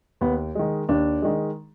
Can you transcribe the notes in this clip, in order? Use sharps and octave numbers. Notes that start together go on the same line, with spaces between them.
D#2 B3
D#3 G#3
D#2 D4
D#3 G#3